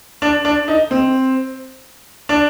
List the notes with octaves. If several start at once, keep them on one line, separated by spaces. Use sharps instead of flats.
D4
D4
D#4
C4
D4